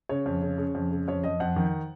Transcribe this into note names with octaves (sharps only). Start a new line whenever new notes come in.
C#3 C#5
F2
C#3
C#3
F2
C#3
F2 C#5
F2 D#5
F2 F#5
D#3